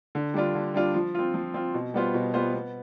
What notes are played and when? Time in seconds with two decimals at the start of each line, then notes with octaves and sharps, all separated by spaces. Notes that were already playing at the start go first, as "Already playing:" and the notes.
0.15 D3
0.34 G3 D4 F4
0.55 D3
0.74 G3 D4 F4
0.94 F3
1.15 C4 F4
1.34 F3
1.54 C4 F4
1.74 B2
1.94 G3 B3 F4 C5
2.14 B2
2.34 G3 B3 F4 C5
2.54 B3